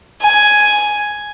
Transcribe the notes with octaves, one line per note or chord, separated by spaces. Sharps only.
G#5